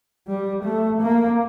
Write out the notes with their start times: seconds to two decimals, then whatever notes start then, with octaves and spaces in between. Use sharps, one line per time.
0.27 G3
0.64 A3
1.02 A#3